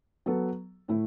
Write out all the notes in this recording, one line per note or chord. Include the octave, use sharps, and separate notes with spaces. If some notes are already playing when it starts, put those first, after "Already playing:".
F#3 B3 A4
A2 A3 E4